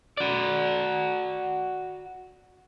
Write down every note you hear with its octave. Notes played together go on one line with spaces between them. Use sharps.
F#4 D5